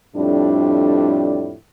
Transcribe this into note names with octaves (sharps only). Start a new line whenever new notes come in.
F2 A2 G3 D4